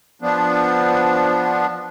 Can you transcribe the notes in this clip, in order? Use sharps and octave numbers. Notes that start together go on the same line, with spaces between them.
F3 B3 D4